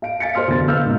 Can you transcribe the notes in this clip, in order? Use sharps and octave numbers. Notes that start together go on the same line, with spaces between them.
F5 D7
F5 G#5 A6 B6 C#7
C5 D#5 C6 F6
F1 E2 D3 F#3 A6
B4 F5 E6 F6 G6
G#2 B2 A#3